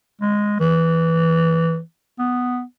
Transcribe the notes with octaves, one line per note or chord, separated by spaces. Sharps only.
G#3
E3
B3